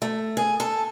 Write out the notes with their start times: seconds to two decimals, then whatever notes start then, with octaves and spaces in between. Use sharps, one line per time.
0.02 A3
0.37 G#4
0.60 A4